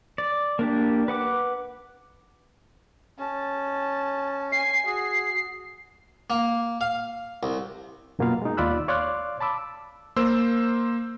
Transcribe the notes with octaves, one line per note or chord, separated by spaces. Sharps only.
D5
A#3 D4 G4
B4 F#5 D6
C#4 A5
G#5 C7
F#4 G#4
A#3
F5
C2
F#2 B2 A#3 B3 F4 F5
G#3 D#4
D#2 F4 D5 B5 E6 F#6
C#5 D5 F5 C6 D6 F#6
A5 B5 D6 E6
A#3 C5 E6